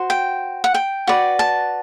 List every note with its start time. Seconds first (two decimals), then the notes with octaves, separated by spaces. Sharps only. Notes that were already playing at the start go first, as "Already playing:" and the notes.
Already playing: F#4 C5
0.10 G5
0.64 F#5
0.74 G5
1.07 F#4 B4 D5
1.39 A5